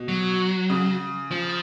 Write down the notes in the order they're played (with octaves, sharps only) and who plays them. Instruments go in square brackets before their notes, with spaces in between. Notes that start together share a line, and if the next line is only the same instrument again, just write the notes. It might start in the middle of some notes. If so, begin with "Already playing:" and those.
Already playing: [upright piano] B2
[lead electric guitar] F#3
[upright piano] C#3
[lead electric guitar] F3